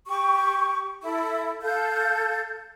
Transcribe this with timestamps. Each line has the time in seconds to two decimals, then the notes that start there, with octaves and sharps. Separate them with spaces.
0.07 G4 C#6
1.03 E4 A4
1.62 A4 F5 G6